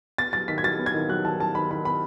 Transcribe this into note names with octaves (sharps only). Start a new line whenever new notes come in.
B3 A6
F#3 A6
D#3 B6
G#6
F#3 A6
B3
G#6
D#3
F#3 F#6
D#3 A5
F#3 A5
D#3 B5
D#3 B5
B3 B5